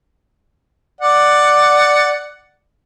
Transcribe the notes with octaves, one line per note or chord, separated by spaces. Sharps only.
D5 F#5